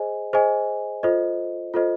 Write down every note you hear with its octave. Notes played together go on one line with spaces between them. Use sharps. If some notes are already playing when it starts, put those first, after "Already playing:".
Already playing: G#4 C5 D#5 G#5
G#4 C5 D#5 G#5
F4 A4 C5 D#5
F4 A4 C5 D#5